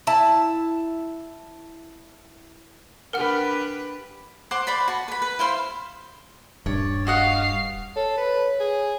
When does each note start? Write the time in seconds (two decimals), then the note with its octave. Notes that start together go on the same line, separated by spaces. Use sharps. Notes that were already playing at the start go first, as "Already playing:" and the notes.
0.07 E4 A5
3.13 D4 G4 A#4 B4 F#5 F6
4.51 C5 F#5 C6 D6
4.67 B4 C5 D5 B5
4.88 F#4 A5
5.08 B4 B5
5.22 B4
5.39 E4 C5 F5 C6
6.66 D#1 G2 C#5 D5
7.07 F#4 D#5 F5 F#5 C7
7.96 A4 C#5
8.17 B4
8.60 G#4